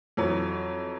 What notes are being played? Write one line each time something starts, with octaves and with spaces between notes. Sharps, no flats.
F2 E3 F#3